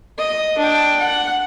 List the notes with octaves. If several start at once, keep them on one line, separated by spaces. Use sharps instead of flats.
D#5
D4 G5
F#5